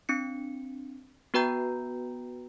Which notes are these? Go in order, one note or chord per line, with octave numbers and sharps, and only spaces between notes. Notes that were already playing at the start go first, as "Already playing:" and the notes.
C4 D4 C#7
B3 F#4 B4 G5 A#5 G6